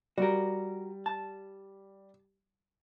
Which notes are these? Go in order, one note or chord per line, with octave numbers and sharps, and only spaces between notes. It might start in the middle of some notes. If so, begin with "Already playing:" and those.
G3 F#4 A#4
A5